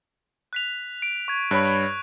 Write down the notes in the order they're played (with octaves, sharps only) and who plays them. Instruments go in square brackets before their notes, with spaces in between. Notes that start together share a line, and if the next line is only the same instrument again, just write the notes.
[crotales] F#6 B6 F7
D7
C#6 G#6
[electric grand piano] G2 C#5 B5 [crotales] F#6